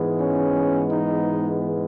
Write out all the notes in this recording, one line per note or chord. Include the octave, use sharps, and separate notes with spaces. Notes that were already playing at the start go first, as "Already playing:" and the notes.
Already playing: G#2 E3 G#3 B3
C#4
D#4